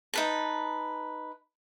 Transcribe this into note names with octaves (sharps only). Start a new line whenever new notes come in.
D#4 B4 A5